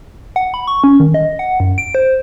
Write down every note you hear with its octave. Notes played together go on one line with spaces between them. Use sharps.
F#5
B5
C#6
C#4
D#3
D#5
F#5
F#2
D7
C5